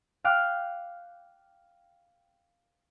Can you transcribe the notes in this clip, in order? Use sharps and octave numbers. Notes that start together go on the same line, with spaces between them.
F5 G5 D6 F6 F#6